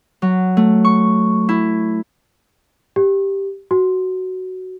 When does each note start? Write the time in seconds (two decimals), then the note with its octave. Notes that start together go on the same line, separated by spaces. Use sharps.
0.22 F#3
0.57 A3
0.85 C#6
1.49 E4
2.96 G4
3.71 F#4